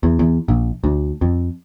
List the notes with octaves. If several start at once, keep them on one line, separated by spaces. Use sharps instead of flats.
E2
E2
A#1
D2
F2